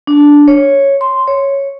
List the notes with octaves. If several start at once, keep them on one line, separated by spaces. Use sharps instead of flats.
D4
C#5
C6
C#5